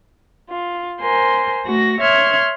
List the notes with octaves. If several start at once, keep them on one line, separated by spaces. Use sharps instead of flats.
F4
A#4 C5 G#5 C6
A3 F#4 A#6
C#5 E5 C6 F6 G#6